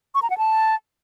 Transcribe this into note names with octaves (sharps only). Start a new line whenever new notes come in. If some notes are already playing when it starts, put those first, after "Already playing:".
C#6
A#5
F#5
A5